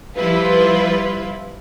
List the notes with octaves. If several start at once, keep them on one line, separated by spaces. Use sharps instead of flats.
F3 G3 E4 F4 B4